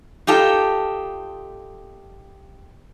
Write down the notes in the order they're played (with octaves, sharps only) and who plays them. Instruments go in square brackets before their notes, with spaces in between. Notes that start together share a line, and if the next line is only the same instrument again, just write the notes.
[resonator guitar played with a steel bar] D#4 F4 G4 A4